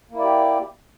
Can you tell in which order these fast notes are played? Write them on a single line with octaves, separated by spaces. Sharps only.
A#3 E4 D5 G4